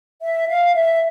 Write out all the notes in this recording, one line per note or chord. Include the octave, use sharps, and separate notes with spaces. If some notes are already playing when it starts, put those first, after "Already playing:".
E5
F5
E5